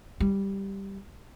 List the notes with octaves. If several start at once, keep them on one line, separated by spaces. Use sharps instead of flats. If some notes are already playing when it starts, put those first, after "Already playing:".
G3